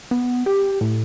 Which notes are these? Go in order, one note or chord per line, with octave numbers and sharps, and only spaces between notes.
B3
G4
A2